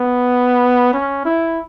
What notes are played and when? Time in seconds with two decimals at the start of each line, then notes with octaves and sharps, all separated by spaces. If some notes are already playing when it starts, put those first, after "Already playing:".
Already playing: B3
0.93 C#4
1.25 E4